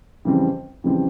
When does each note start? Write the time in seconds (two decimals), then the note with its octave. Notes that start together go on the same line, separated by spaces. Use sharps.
0.25 F2 C#3 E3 G3 C4
0.84 F2 C#3 E3 G3 C4